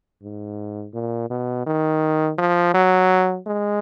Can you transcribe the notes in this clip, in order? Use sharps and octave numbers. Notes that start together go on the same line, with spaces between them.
G#2
A#2
B2
D#3
F3
F#3
G#3